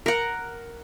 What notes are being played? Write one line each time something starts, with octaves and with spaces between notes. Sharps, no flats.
A#4 F#5